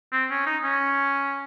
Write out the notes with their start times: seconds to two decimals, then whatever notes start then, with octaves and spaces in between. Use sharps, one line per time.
0.13 C4
0.31 C#4
0.46 D#4
0.64 C#4